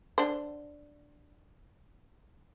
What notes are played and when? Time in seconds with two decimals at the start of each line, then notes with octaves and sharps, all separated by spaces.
0.18 D3 D4 C5